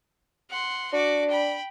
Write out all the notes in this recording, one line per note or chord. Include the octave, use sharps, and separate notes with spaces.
F#5 C6
D4 F#4 D6
G5 B5